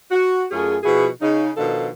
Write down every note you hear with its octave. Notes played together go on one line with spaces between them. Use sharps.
F#4
F#2 A3 C#4 F4 G#4
B2 F3 E4 F#4 G#4
C#3 D#4
B2 D#3 F3 D4 D#4 A4